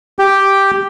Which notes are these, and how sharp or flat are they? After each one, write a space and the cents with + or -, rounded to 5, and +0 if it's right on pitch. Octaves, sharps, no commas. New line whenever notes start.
G4 +0 G5 +0